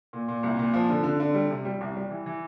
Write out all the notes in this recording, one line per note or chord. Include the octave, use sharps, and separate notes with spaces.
A#2
A#2
C2
A#2
F3
D3
D3
D3
G3
C3
G3
C2
G3
E3
E3